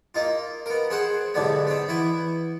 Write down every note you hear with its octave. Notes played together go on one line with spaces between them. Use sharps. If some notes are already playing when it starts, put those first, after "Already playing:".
A#3 D#4 F4
B3 A#4
C4 G#4 C5 F#5
B1 G#2 D3 G3 B3
B3 C4
E3 B3 E4